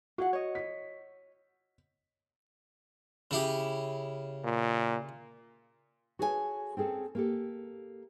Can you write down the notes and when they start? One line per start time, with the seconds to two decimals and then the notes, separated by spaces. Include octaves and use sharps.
0.18 F4 F#4 G#4 F#5
0.33 C#5 D#5
0.55 B6
3.31 C#3 E4 G4
4.44 A#2
6.19 F#4 G#4 A4 C#5 D#5 G#5
6.77 C4 C#4 G#4 A4
7.15 A#3 G4 A4